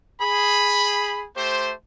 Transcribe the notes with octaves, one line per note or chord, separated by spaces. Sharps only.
G#4 B5
A3 G4 C5